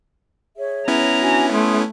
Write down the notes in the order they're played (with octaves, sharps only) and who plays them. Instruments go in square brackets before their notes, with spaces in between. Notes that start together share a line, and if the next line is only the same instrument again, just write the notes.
[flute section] G#4 C#5 E5
[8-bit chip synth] B3 C#4 E4 [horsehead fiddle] A#5
[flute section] D4 F#4 G#5
[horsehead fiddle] A3 [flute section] C6 D#6